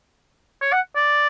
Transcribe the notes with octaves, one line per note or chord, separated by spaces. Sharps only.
C#5
F#5
D5